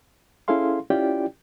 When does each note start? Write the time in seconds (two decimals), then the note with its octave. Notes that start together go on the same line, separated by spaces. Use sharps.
0.48 C#4 E4 G#4 A4 F5 C6
0.90 C#4 E4 F4 G4 D5 G5